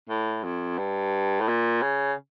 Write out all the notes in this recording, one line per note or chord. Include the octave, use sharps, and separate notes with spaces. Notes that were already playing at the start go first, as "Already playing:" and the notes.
A2
F2
G2
A2
A#2
C#3